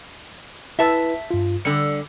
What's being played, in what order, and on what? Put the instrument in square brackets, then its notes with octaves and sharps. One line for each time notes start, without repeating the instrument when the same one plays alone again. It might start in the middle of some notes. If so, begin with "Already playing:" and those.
[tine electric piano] E4 B4 [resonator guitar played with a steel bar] E5 A5
[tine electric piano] G2 F4
[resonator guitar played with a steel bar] D3 G3 [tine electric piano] C#7